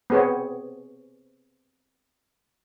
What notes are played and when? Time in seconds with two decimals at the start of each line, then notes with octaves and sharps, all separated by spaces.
0.10 B3 C4 G#4 C5 C#5